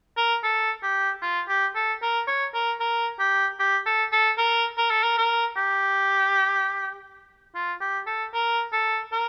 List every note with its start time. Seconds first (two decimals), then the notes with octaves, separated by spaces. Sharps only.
0.17 A#4
0.43 A4
0.83 G4
1.22 F4
1.48 G4
1.75 A4
2.02 A#4
2.27 C#5
2.54 A#4
2.80 A#4
3.19 G4
3.59 G4
3.86 A4
4.12 A4
4.38 A#4
4.77 A#4
4.91 A4
5.03 A#4
5.18 A#4
5.56 G4
7.55 F4
7.81 G4
8.06 A4
8.34 A#4
8.72 A4
9.12 A#4